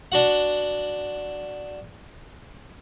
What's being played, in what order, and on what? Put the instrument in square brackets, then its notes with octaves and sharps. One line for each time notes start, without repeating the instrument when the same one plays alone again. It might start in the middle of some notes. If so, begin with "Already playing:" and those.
[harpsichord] D4 F#4 F#5